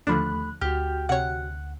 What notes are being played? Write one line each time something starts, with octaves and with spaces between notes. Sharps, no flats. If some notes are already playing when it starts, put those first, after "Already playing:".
D#2 D3 F3 A3 D4 B5 F#6
D2 F#4 G4 F6
C3 C#5 F#5